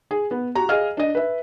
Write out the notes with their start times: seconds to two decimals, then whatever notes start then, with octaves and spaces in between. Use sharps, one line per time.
0.11 G#4
0.31 B3
0.55 F#4 G4 A#5
0.69 G#4 D#5 F5 F6
0.97 D4 D#5
1.15 B4 E5